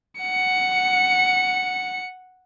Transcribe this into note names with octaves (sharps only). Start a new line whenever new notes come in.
F#5 C#7